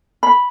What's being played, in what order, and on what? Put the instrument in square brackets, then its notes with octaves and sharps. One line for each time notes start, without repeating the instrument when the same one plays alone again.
[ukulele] B5